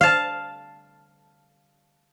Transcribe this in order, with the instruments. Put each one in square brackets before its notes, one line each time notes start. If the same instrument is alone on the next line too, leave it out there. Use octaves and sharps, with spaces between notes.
[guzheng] F5 A5